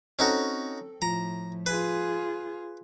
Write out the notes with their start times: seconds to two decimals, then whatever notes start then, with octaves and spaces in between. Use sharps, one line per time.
0.19 C4 C#4 D#4 F#4 A4
1.02 A2 F3 A#5
1.66 F4 G#4 B4